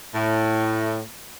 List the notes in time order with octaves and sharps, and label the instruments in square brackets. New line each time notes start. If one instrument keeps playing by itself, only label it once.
[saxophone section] A2